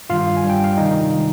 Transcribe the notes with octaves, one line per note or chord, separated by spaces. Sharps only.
G2 D#3 G3 F4 F5
G#5
G2 G3
G5
F5
C3 D#3 G3 D#4 D#5
D#3 G#3